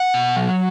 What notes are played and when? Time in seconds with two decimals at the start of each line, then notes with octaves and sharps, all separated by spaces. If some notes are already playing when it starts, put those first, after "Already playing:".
Already playing: F#5
0.14 B2
0.36 F#3